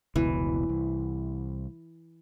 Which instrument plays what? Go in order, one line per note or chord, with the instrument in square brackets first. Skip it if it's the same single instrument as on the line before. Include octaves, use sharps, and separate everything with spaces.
[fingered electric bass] F1 C#2 B2 [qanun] E3
[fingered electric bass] C2